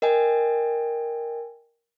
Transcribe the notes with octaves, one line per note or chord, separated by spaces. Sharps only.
A#4 D#5 G5 G#5